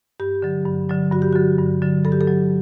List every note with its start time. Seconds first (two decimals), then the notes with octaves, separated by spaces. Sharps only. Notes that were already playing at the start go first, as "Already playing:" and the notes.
0.20 G2 G4
0.42 D3 F#3
0.65 G2
0.89 D3 F#3
1.11 G2 F#4
1.22 G4
1.33 D3 F#3 F#4
1.58 G2
1.82 D3 F#3
2.05 G2 A4
2.12 G4
2.21 A4
2.27 F#3